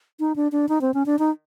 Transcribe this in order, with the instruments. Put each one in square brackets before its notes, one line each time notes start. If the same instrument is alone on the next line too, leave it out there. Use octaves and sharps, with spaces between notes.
[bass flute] D#4
D4
D4
D#4
C4
C#4
D4
D#4